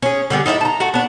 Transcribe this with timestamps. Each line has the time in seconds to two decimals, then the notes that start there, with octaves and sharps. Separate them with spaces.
0.02 C#4 G#4
0.30 D3 G3 B3 G#4
0.46 D#4 E4 A4 E5
0.61 A5 A#5
0.80 A3 F#4
0.94 B3 D4